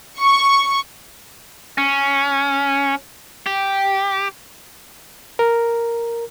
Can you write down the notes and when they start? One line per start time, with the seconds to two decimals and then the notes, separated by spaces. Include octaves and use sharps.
0.20 C#6
1.78 C#4
3.46 G4
5.39 A#4